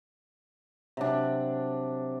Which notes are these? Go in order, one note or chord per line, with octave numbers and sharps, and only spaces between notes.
C3 F#3 D4